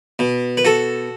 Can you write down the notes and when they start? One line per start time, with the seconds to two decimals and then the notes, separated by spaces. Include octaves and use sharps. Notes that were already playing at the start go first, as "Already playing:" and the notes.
0.19 B2
0.57 B4
0.65 F#4 A4